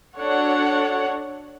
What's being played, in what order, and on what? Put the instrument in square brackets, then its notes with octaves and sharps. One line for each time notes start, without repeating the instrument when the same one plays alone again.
[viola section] D4 F#4 A4 C#5 F#5